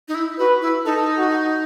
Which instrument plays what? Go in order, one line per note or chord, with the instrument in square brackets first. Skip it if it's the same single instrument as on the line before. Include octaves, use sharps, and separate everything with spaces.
[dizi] D#4
E4
[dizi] F#4 [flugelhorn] B4
[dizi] E4
[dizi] D#4 [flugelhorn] A4
[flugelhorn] F#4